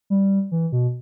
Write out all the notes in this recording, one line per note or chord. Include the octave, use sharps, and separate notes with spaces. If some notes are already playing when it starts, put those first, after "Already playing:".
G3
E3
B2